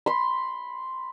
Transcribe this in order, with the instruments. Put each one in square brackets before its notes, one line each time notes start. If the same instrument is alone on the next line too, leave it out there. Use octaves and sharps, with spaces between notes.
[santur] B5 C6